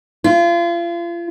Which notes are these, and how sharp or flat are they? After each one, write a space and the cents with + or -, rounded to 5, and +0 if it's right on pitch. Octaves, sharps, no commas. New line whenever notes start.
F4 -35